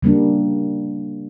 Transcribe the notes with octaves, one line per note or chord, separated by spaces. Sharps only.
C#3 G3 A#3 D4